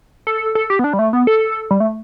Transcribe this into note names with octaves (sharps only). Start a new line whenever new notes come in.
A4
A4
G4
B3
D4
G3
A3
B3
A4
G3
A3